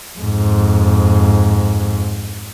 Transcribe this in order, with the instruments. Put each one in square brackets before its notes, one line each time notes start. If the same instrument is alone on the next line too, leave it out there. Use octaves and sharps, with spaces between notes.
[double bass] F2 G#2